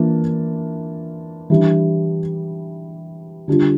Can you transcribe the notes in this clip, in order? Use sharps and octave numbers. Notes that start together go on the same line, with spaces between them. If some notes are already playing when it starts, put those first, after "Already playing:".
Already playing: E3 A#3 D4 F4
E3 G3 D4
D3 G3 D4 F4